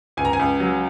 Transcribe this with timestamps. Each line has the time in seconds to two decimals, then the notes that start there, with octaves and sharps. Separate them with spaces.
0.17 C#2 G#5
0.25 A#5
0.33 G#5
0.39 C#2
0.60 F#3